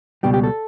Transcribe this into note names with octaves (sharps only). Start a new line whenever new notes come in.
C#2 B2 G3 G4
G4
A4